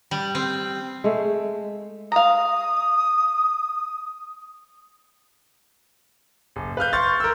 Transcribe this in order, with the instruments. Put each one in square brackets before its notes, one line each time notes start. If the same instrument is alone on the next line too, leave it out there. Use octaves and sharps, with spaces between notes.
[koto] G3
C4
[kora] G#3 A3
[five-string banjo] F5 A#5 [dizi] D#6
[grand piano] F#1
B4 F5 F6 G6
C6 C#6 F6 G6 A6
A#4 E6